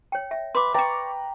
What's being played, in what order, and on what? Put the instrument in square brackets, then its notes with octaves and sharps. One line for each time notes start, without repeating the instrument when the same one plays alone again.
[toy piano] C#5 G5
E5
[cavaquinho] B4 [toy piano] C6 D6
[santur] B4 G5 A#5 [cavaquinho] D5 C#6